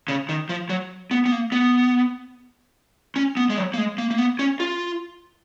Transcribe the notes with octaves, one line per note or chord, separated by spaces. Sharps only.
C#3
D#3
F3
F#3
B3
B3
A#3
B3
C#4
B3
G#3
F#3
A#3
G#3
A#3
A#3
B3
C#4
F4